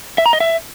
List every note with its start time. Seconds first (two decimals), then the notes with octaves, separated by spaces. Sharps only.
0.18 E5
0.26 A#5
0.33 D#5
0.40 E5